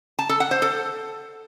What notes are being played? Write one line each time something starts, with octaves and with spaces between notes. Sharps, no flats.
A5
A4
F#5
C5
A4